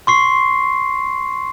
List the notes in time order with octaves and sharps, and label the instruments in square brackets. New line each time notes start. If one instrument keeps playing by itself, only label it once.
[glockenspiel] C6 C#6 C7